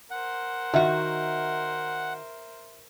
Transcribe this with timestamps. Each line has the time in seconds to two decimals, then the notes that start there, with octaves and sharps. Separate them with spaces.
0.11 A#4 C5 F#5
0.74 D#3 F#4 E5